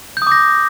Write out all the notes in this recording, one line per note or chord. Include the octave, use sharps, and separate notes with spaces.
D6 D#6 G6 A#6